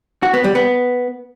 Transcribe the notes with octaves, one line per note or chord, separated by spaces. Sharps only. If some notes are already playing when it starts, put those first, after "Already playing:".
F#4
B3
G3
B3